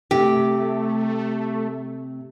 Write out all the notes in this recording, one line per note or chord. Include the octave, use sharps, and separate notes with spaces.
C3 A3 G4